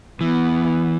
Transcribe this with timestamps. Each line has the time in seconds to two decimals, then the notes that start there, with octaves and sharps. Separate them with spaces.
0.21 E3 B3